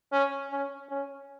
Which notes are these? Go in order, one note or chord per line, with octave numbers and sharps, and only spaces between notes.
C#4
C#4
C#4